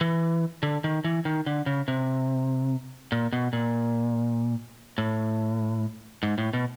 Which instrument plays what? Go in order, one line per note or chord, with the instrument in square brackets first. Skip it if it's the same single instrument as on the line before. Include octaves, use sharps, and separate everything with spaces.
[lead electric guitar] E3
D3
D#3
E3
D#3
D3
C#3
C3
A#2
B2
A#2
A2
G#2
A2
B2